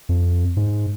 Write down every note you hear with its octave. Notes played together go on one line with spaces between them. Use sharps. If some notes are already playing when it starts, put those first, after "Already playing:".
F2
G#2